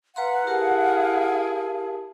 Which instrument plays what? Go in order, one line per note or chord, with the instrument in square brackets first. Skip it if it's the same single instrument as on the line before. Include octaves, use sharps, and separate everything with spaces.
[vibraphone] B4 A#5 C6 [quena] F5 [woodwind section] F#5
[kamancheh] E4 G#4 [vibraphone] G4 A#4 A5